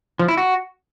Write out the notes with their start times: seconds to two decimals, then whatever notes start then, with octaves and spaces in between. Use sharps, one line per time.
0.19 F3
0.28 E4
0.37 F#4